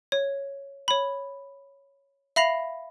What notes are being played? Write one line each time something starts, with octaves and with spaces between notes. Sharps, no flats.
C#5
C#5 B5
E5 F5 B5 A#6 C7 F7